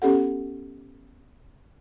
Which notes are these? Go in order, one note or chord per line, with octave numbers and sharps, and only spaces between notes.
B3 C#4 G4 A4 F#5